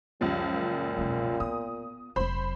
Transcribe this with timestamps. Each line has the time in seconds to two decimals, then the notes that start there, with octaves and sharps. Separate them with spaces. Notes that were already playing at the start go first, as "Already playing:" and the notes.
0.21 C#2 F#2 F3 G3
0.52 A#2
0.98 E1 G#3
1.40 B3 D#6
2.16 F1 F#3 C5 B5